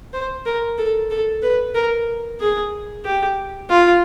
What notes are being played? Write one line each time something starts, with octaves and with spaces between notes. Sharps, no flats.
C5
A#4
A4
A4
B4
A#4
G#4
G4
F4